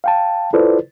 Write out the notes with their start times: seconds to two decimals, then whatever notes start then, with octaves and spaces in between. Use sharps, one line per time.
0.04 F5 G5 A5
0.53 E4 F4 A4 B4 C5 D5